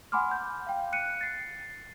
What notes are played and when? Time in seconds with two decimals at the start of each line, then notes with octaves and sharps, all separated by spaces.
0.12 F#5 G#5 B5 C6 D6 F6
0.31 G6
0.67 F5 G5
0.92 F#6 C#7 D#7
1.21 A6 C7